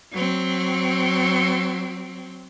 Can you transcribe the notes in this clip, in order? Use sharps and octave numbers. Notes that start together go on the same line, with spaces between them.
F#3 C4